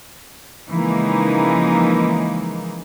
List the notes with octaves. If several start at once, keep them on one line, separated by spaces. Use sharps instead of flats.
C#3 E3 F3 G#3 A#3 D#4